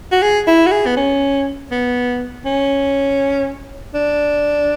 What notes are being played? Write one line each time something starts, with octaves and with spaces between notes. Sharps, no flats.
F#4
G#4
E4
F#4
G#4
B3
C#4
B3
C#4
D4